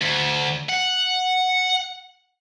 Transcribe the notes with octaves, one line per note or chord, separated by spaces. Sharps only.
D2
F#5